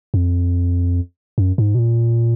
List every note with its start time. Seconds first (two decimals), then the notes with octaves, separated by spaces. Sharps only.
0.14 F2
1.38 F#2
1.58 G#2
1.75 B2
1.79 A#2